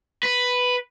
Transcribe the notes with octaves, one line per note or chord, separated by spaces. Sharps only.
B4